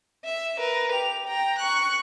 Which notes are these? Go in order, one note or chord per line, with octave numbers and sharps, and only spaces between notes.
E5
A#4 B4
G4 F7
G5 A#5
C#6 F#6